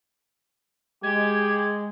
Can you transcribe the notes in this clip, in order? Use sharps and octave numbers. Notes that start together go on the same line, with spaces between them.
G#3 G4 G#6